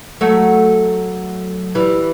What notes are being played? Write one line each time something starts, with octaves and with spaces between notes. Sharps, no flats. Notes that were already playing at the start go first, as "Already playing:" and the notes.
F#3 A3
E3 G3